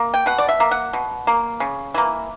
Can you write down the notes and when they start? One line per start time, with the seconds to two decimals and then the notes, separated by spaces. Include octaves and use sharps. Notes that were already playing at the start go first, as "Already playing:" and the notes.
Already playing: A#3
0.14 G5
0.26 B2 F#5
0.38 D5
0.49 E5
0.60 A#3
0.71 F#5
0.93 B2
1.27 A#3
1.60 C#3
1.94 E3 A#3